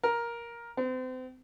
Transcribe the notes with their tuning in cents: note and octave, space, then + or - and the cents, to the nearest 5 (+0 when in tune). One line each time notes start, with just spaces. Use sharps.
A#4 +10
C4 -35